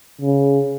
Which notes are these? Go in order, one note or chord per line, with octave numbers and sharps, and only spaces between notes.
C#3